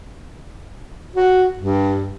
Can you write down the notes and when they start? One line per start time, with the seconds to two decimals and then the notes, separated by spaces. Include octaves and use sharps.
1.15 F#4
1.59 G2